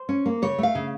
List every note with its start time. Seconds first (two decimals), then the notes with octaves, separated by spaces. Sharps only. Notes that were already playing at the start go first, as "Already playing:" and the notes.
Already playing: C5
0.09 C#4
0.26 A#3
0.42 C#3 C#5
0.58 A3 F5
0.75 C#3